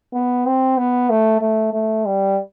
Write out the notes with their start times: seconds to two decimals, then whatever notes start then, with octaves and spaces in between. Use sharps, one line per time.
0.14 B3
0.46 C4
0.78 B3
1.10 A3
1.41 A3
1.73 A3
2.06 G3